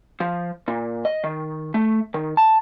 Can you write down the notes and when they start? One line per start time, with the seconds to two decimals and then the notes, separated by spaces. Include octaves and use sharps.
0.20 F3
0.68 A#2
1.05 D#5
1.24 D#3
1.74 A3
2.14 D#3
2.37 A5